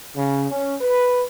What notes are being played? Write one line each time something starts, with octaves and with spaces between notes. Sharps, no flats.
C#3
C#4
B4